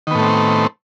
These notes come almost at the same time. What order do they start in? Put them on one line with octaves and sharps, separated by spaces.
D#3 B3 A2 A3 C4